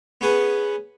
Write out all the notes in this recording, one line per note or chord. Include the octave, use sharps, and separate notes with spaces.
B3 C#4 G#4 B4